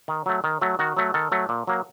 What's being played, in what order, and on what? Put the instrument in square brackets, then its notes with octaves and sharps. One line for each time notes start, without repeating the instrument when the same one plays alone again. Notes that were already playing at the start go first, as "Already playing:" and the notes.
[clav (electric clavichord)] D#3
F#3 A3
D#3
F#3 A3
D#3 F#4
F#3 A3
D#3 A4
F#3 A3
A#2
F#3 A#3